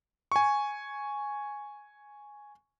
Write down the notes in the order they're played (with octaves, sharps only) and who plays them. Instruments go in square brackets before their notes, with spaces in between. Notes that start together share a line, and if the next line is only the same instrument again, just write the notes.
[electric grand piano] G#5 C#6